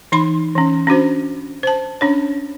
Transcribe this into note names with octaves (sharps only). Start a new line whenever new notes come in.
E3 D#4 B5 C6
E3 C#4
C#4 D4 F#4 C5
C5 A5
C#4 D4 C#5